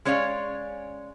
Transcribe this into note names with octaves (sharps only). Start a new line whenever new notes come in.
G#3 C#4 C#5 D5 F5